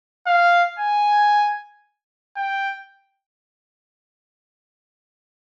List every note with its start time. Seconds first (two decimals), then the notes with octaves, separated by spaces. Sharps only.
0.27 F5
0.79 G#5
2.37 G5